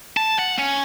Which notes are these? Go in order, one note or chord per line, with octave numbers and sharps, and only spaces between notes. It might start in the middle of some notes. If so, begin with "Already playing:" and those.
A5
F#5
C#4